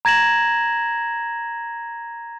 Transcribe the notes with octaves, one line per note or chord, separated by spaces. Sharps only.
A#5 G#6 A#6 E7 F#7